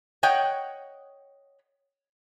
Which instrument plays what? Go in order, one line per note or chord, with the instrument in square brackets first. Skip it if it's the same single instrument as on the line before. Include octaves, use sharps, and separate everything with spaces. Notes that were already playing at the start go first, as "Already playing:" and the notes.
[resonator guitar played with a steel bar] C#5 D#5 F#5 G5